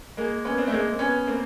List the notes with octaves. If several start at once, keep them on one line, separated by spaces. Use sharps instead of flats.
G#3 A#3
B3 C#4
C4 D4
A3
G#3 A#3
C4
B3 C#4
A#3 C4